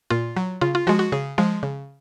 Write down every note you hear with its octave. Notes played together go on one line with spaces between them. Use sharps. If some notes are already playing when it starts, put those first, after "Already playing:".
A#2 F4
F#3
C#3 F4
F4
F3 G#3 F#4
F#4
C#3 G#4
F3 G#3
C#3